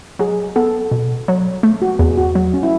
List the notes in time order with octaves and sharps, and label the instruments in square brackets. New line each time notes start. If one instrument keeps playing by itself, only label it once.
[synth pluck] F#3 [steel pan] G#4
[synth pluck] B3 [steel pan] A4
[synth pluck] B2
F#3
A3
[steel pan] F#4
[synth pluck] E2 [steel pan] G#4
[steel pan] F#4
[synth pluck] F#3
[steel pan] C#4
E4